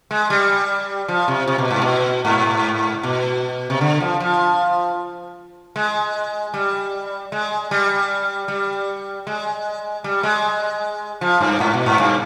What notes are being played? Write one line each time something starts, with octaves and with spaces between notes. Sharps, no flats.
G#3
G3
F3
C3
C3
B2
G#2
B2
G#2
B2
C3
D3
F3
F3
G#3
G3
G#3
G3
G3
G#3
G3
G#3
F3
G2
G#2
B2
G#2
G2